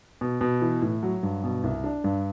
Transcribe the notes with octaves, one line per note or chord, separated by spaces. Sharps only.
B2
B2
E3
A2
F#3
G2
B2
C2
D4
G2